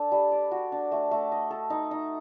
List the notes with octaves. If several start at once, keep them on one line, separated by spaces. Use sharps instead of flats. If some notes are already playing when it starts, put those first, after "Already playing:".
Already playing: D4 A4
G3
D5
F#4
D4
A3
A3
D#5
A4
D#4
D#4